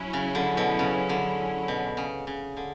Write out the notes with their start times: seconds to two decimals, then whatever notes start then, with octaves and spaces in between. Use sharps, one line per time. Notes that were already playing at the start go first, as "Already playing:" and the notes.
Already playing: F#3 C#4 E4
0.13 C#3
0.35 D3
0.57 B2
0.79 C#3
1.09 D3
1.68 B2
1.97 C#3
2.27 C#3
2.57 D3